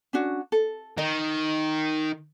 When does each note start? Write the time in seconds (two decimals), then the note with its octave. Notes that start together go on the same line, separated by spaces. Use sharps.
0.13 C#4 D4 F#4
0.52 A4
0.98 D#3 D#4 D#5